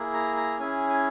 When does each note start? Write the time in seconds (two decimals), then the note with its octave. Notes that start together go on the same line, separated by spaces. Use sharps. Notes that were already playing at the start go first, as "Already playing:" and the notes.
Already playing: A#3 E4 G#4
0.14 A#5
0.37 A#5
0.59 C#4 E4 G#4 G#5
0.90 G#5